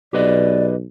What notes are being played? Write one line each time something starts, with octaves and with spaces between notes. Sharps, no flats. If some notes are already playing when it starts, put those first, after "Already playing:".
B1 G4 B4 D5 D#5